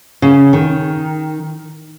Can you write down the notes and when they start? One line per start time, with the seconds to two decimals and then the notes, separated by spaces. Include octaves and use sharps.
0.22 C#3
0.53 D#3